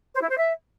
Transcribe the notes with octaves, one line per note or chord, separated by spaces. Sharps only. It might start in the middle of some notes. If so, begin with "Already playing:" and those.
C5
E4
C5
E5